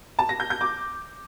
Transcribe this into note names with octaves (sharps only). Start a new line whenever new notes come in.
A5
A#6
G6
G6
D6